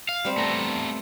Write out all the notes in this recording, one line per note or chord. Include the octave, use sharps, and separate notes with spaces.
F5
G3 C4
A3 B3 A#5